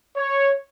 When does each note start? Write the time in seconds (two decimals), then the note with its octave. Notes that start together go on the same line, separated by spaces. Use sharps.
0.17 C#5